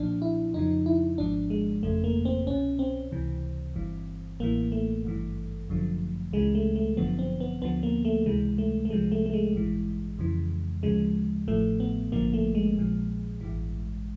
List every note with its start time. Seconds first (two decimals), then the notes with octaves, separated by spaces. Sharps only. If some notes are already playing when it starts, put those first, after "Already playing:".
Already playing: B1 A#2 F3 D4
0.22 E4
0.54 F2 C#3 F3 D#4
0.86 E4
1.18 G#1 G#2 F3 D4
1.50 G#3
1.83 G1 F2 C#3 A3
2.04 A#3
2.25 C4
2.47 C2 B2 C#4
2.79 C4
3.12 C#2 C3 E3
3.76 G1 G2 E3
4.40 A1 A2 E3 A#3
4.72 A3
5.04 G#1 G2 E3
5.69 G1 F#2 D3 F3
6.33 C#2 C#3 E3 G#3
6.55 A3
6.76 A3
6.97 G1 F#2 D3 F3 B3
7.19 C4
7.40 B3
7.62 D2 D3 F3 B3
7.83 A#3
8.05 A3
8.26 C#2 C3 E3 G#3
8.58 A3
8.85 A3
8.90 C2 C3 F3 G#3
9.12 A3
9.26 A3
9.34 G#3
9.54 A1 G2 E3
10.19 F2 C#3 E3
10.83 D2 C#3 F3 G#3
11.48 A1 A2 F3 A3
11.80 B3
12.12 A1 G2 D3 F3 A#3
12.34 A3
12.55 G#3
12.77 A#1 A#2 F3
13.41 A1 G2 E3